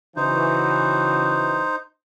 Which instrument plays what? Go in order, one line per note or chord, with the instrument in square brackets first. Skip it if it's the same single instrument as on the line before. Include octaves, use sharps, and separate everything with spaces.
[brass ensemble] C#3 E3 F#4 [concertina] D#4 C5